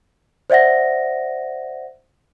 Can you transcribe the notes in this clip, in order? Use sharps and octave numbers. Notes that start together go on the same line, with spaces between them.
C5 D5 E5 F#5 A#6